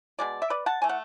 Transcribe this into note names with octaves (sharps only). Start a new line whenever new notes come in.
B2 G#3 D5
E5
B4 D5
F#5 A5
E3 A3 G#5
F#5